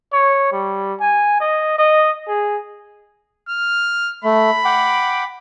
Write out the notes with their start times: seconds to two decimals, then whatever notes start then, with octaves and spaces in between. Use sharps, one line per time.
0.13 C#5
0.52 G3
1.00 G#5
1.40 D#5
1.79 D#5
2.28 G#4
3.49 F6
4.24 A3 B5
4.65 F#5 G5 D6